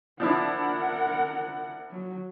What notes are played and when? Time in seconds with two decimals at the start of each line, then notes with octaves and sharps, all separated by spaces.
0.20 F3 D4 E4 A#4 F#5
1.91 F#3